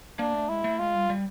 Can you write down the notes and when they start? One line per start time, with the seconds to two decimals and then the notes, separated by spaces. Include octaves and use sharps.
0.19 A#3 D4
0.34 A3
0.49 G#3 E4
0.64 A3
0.79 G#3 F4
0.94 G3
1.10 G3